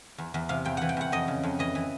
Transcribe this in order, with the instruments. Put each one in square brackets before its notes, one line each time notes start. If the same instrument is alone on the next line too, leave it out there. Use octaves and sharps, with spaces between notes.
[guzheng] E2
E2
C3 F5
E2 G5
E3 F#5
G5
E2 F#5
F2 D#5
C#3
F2
E3 D#5
E3